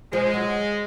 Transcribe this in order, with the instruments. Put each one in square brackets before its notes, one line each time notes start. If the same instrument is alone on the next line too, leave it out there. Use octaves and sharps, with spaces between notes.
[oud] F3 [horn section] G#3
[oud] F#3